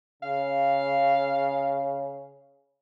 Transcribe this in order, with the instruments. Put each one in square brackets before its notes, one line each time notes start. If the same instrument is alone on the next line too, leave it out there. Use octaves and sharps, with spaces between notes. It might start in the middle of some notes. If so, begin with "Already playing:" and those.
[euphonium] C#3 [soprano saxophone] F5